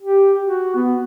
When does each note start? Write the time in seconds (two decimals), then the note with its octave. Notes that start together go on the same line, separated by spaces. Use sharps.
0.02 G4
0.44 F#4
0.76 B3